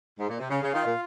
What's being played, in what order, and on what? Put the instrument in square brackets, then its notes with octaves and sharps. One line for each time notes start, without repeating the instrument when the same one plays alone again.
[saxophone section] G#2
A#2
C3
[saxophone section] C#3 [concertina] F5
[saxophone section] C#3
[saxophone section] D#3 [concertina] F4
[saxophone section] A#2